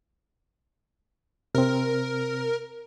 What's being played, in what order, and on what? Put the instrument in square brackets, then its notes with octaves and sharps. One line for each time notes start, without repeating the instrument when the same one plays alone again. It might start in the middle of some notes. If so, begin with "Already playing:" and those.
[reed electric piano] C3 C4 [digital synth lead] A#4